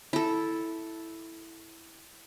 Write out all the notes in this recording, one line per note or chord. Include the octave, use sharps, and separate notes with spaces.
E4 A4